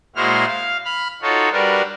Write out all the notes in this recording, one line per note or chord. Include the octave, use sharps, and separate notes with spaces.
A#2 G#3 E4 F#4 C5 F6
F5
B5 F6
D#4 F4 F#4 A4 C#5
G3 D4 F#4 A#4 B4